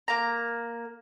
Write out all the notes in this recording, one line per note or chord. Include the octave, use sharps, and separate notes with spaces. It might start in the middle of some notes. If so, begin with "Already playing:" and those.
A#3 A#5